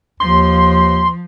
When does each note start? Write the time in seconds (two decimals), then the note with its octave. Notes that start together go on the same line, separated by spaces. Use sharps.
0.20 D#2 F3 C6